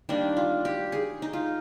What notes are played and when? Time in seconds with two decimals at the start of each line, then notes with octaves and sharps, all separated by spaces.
0.09 D#3 G3 A#3 D4
0.37 F4
0.65 G4
0.92 G#4
1.22 D#4
1.33 F4